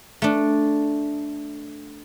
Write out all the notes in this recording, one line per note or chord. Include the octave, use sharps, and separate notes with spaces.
A3 D4